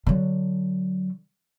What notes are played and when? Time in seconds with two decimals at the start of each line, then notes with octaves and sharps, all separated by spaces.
0.07 D3 F#3